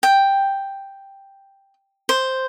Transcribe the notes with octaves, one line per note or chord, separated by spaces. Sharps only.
G5
C5